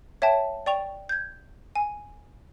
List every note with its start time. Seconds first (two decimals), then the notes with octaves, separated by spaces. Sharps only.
0.22 C#5 E5 G5 A5
0.66 D5 G5 C#6 F7
1.09 G6 G#6
1.75 G#5